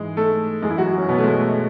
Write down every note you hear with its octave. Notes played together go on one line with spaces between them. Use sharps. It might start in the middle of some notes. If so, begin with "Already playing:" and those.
Already playing: G#2 E3 G#3 G#4
A3 A4
F#2 E3 G#3 G#4
E4
F#3 F#4
C#4
B2 B3
A3
G#3
A3